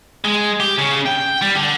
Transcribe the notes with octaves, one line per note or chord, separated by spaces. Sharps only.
G#3
G4
C#3
G5
G3
D3